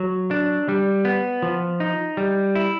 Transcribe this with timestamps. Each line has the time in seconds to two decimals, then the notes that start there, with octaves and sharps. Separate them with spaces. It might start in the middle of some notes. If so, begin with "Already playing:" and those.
Already playing: F#3
0.31 D4
0.69 G3
1.05 B3
1.42 F3
1.80 D#4
2.17 G3
2.55 E4